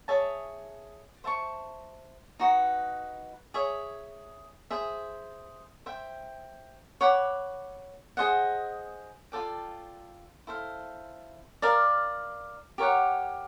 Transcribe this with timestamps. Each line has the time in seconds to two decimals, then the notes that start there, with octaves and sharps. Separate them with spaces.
0.08 G#4 C#5 E5 A5
1.24 C5 E5 A5 C#6
2.40 D#4 F#4 B4
3.54 G#4 C#5 E5
4.71 G#4 C5 E5
5.86 C5 E5 G5
7.01 C#5 F#5 B5 D6
8.17 G#4 C5 D#5 F#5
9.32 F4 A4 D5 G5
10.47 E4 A4 C5 F5
11.62 A#4 D5 F5
12.78 G4 A#4 C#5 F#5